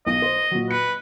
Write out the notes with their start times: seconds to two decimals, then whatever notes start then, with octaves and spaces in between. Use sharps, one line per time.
0.07 B1 D#5
0.22 C5
0.51 A#2 F#3
0.71 B4 C#7